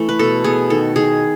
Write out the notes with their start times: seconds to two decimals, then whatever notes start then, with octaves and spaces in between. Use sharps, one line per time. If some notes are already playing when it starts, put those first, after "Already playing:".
Already playing: E3 A3
0.09 B4
0.19 B2 A4
0.44 B3 G#4
0.70 D#3 A4
0.96 D#3 G#4